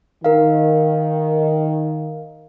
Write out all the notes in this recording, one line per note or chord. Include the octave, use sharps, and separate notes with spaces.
D#3 A#4 F5